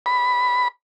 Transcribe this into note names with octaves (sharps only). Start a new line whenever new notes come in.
B5